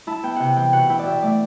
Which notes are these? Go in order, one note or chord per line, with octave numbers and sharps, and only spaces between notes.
E4 A5
B3 G5
C3 F#5 G5
E3 G5
B2 F#5
E4 G5
D5
B2 E5
A3 D5